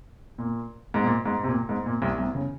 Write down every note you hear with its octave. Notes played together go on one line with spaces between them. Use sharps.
A#2
G#2
A#2
G#2
C3
A#2
G#2
A#2
C2 C3
C2 C3
C#3